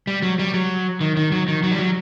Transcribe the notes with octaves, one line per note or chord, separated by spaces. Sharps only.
G3
F#3
G3
F#3
D#3
D#3
F#3
D#3
F#3
G3
F#3